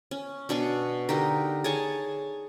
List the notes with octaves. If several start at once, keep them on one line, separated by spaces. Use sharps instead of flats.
C#4
B2 D4 G#5 C#6
D3 D#4 G4 A#4
G#4 C#5 G#5 A5